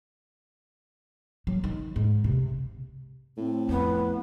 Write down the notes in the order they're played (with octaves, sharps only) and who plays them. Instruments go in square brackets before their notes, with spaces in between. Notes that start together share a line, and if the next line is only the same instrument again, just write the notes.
[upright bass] F#3
D#3
G#2
C3
[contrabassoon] A2 [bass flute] C4
[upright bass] F2 [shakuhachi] B3